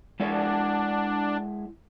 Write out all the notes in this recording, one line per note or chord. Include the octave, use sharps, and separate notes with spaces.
G#3 D4 E4 D5